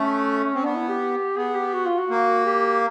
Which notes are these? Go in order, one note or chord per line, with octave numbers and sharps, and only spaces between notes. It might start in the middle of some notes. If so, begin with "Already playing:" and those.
Already playing: A3 C#4
C4
B3 D4
E4
G4
B3 G#4
G4
F#4
F4
F#4
A#3
G4